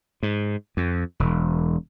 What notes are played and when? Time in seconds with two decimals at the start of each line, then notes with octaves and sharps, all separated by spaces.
0.23 G#2
0.77 F2
1.20 E1